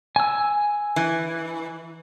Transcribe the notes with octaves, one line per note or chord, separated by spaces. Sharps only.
G#5 E6
E3